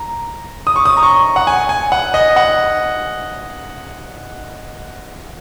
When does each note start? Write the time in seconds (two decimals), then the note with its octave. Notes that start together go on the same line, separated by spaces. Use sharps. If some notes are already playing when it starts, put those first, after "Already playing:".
Already playing: A#5
0.67 D#6
0.76 C#6
0.85 D#6
0.97 A#5
1.03 C#6
1.36 F#5
1.47 G#5
1.69 G#5
1.92 F#5
2.14 D#5
2.36 F#5